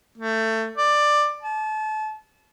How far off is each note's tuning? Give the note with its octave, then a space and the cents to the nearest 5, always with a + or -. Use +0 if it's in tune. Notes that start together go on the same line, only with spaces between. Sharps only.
A3 +20
D5 +10
A5 -30